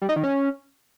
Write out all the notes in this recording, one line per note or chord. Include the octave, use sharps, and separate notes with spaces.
G3
D#4
D#3
C#4